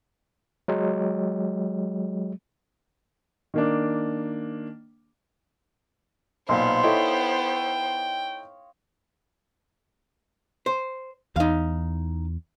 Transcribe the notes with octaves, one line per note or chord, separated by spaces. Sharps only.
F#3 G#3
D#3 A#3 D4
B1 A#2 B3 C5 F5 G5 C6
D#4 E4 A4 C#5 D#5 G5
C5
E2 D#4 F5